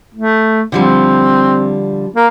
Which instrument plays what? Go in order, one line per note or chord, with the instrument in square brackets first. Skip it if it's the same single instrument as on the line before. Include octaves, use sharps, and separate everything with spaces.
[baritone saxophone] A3
[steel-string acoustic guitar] D3 F3 G3 [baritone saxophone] C4
[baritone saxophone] A#3